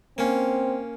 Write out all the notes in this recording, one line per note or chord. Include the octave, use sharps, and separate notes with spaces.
A#3 C4 C#4